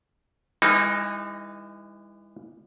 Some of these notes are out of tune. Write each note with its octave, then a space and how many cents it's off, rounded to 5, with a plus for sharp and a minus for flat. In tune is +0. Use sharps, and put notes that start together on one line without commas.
E3 +0 G#3 -45 D#4 -5